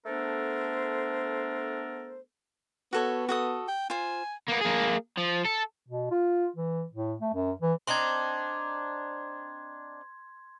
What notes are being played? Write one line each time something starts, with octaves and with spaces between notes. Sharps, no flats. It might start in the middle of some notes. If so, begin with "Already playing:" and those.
A3 B3 D4 A4 A#4 C5
B3 F#4 A4 C#5
F#4 A4 D#6
G5
F4 C5 G#5
A#3 B3
A#3 G#4
F3
A4
B2
F4
E3
A2
A3
F#2
E3
C4 D4 D#4 C6 G#6